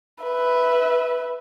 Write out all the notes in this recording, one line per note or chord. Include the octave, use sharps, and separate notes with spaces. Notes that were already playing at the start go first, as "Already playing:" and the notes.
B4 E5